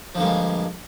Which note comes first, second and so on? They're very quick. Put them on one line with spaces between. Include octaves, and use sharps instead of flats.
F3 D3 A#3 G2 G#3